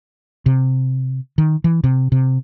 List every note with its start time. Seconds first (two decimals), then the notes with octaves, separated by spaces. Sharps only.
0.46 C3
1.38 D#3
1.64 E3
1.84 C3
2.12 C3